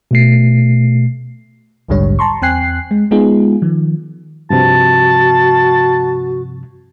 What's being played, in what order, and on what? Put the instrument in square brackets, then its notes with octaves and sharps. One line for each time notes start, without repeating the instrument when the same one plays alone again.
[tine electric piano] B2 A3 C7
[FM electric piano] A#1 D#2 G#2 D3 G3 C#5
A5 A#5 C6 C#6
E2 C4 G5 G#5 F#6 C7
G#3
G#3 B3 D#4 F4 G#4
D#3 F3
[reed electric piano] G2 C3 F3 [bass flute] F#4 [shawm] A5